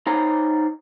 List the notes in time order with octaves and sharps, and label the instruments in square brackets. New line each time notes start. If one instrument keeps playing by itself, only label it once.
[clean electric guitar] D#4 C5 C#5 G#5 A#5 B5